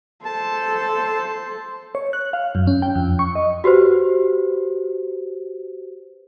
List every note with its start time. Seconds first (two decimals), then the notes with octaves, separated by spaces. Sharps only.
0.25 A4 C5 A5
1.95 C#5
2.13 F#6
2.33 F5
2.55 F#2
2.67 C#4
2.82 G5
2.95 F2
3.19 C#6
3.35 D#5
3.64 F#4 G4 B4 C5